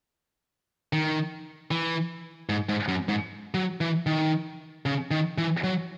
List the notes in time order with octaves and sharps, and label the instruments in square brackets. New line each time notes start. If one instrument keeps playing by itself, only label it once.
[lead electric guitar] D#3
E3
G#2
G#2
F#2
G#2
F#3
E3
D#3
C#3
D#3
E3
F#3